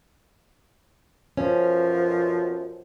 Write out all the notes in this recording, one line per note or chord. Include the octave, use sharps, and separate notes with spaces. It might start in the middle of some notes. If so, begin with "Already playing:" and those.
F#2 B2 F3 C#4